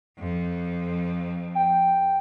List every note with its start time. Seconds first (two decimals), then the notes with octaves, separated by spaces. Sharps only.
0.19 F2
1.55 G5